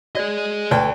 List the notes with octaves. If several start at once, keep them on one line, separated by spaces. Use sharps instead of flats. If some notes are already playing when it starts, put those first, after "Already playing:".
F#4 G#4 D5 D#5
D2 A4 B4 D5 G5